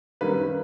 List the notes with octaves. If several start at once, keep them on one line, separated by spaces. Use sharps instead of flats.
F#2 D#3 G3 A#3 B4